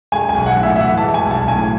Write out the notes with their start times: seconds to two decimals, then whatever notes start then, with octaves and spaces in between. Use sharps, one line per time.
0.12 G#3 G#5
0.29 G#5
0.34 B1
0.46 F#5
0.57 A2
0.63 E5
0.76 E5
0.80 E3 F#5
0.98 A5
1.02 G#3
1.14 G#5
1.26 B1
1.31 A5
1.48 A2 G#5